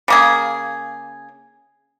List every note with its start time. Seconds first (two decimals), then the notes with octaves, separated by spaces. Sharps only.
0.08 C#3 A#3 G#4